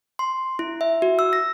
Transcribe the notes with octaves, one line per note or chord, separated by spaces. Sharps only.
C6
E4
E5
F#4
E6
A#6